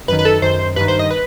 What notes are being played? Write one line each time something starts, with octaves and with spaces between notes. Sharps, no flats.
F#2 D#3 B4
B4
A4
F#2 D#3 C5
G2 D#3 B4
C5
D#5
B4